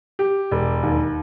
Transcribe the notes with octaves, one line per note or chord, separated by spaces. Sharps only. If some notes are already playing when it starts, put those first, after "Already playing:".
G4
E1
D#2